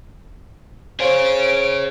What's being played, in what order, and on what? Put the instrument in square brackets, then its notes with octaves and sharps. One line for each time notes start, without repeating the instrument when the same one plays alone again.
[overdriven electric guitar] G#4 C#5 [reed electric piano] C5 F5 [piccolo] D7